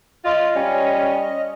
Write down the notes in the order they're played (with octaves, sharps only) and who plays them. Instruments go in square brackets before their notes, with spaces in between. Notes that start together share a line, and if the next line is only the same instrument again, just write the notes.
[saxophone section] F4 [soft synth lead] D#5
[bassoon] G3 [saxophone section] C#4